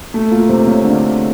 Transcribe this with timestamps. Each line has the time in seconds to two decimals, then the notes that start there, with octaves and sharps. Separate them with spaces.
0.14 A3
0.31 A#2 A#3
0.49 C3 C4
0.67 C#3 C#4
0.84 D3 D4